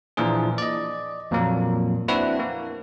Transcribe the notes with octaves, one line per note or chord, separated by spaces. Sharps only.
A#2 E3 F3 D4 G#4
D5 D#5
F2 A#2 F#3 A#3
C4 D4 E4 F#4 B4
A#3